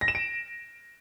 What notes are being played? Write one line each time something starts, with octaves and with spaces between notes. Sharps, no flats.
A#6
E7
D7